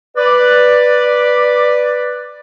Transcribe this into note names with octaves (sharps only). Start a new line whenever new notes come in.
B4 D5